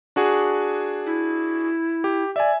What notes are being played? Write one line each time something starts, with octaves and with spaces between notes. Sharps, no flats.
D4 F#4 G#4
E4
G4
D5 E5 G#5